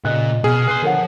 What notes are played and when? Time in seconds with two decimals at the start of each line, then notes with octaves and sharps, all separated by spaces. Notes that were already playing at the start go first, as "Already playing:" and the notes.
0.04 A#2 C#3 D#5 F#6
0.44 B2 G#4 F6
0.68 B4 C6 F#6 C7
0.83 D3 F3 A#4 C#5 F#5